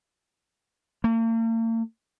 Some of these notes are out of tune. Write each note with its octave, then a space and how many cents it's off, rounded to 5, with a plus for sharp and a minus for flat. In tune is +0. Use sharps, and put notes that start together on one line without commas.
A#3 -45